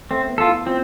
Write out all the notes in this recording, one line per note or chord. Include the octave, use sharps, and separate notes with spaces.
A3 C4
B3
F4 A4
E4
C4 F4